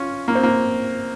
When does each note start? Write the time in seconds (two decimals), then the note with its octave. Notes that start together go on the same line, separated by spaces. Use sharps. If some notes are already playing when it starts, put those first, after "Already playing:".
Already playing: C#4 F4
0.28 A#3
0.35 C4
0.43 A#3